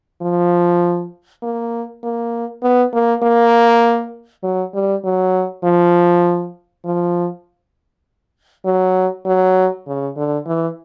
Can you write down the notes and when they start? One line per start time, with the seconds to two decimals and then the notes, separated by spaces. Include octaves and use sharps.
0.22 F3
1.43 A#3
2.03 A#3
2.63 B3
2.93 A#3
3.23 A#3
4.43 F#3
4.74 G3
5.04 F#3
5.64 F3
6.85 F3
8.66 F#3
9.26 F#3
9.87 C#3
10.16 D3
10.46 E3